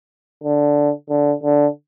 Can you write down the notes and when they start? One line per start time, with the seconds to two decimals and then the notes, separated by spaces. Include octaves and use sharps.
0.44 D3
1.09 D3
1.43 D3